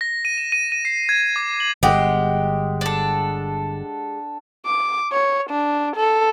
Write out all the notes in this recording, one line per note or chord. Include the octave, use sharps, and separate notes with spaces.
A#6
D#7
E7
D#7
D#7
C7
G#6
D6
F#7
G1 G#3 G4 F#5 G5
D4 A4
D6
C#5
D4
A4